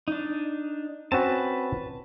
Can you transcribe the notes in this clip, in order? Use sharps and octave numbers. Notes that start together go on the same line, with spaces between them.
D4 D#4
C4 C#4 F#4 B4 A5